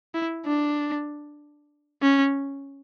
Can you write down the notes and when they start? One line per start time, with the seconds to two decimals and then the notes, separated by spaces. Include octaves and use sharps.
0.14 E4
0.46 D4
2.02 C#4